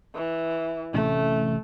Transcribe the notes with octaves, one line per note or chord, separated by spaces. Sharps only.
E3
A1 C3 A3 C#4